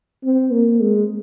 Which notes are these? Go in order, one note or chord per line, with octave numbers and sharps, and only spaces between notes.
C4
A#3
G#3